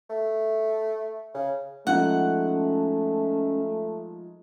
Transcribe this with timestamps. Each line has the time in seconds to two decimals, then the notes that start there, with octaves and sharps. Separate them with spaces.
0.09 A3
1.35 C#3
1.87 F3 G#3 A3 C#4 D#4 F#5